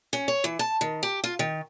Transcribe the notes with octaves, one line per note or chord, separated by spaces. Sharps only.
C#4
C#5
E3
A5
D#3
G4
F4
D#3